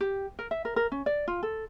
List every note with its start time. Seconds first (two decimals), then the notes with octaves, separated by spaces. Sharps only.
0.01 G4
0.39 A#4
0.51 E5
0.65 A#4
0.76 A#4
0.92 C#4
1.06 D5
1.28 F4
1.43 A4